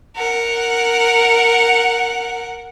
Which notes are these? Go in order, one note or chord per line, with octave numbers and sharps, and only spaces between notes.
A#4 F#5